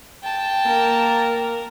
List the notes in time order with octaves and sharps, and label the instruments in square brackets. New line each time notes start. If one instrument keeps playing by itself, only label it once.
[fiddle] G5 A5
[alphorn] A#3 [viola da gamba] A#4